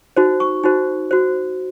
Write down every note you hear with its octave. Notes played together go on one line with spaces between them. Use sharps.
D#4 F#4 C5
C#6
D#4 F#4 C5
F#4 C5